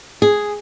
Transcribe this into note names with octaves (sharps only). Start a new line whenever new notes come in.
G#4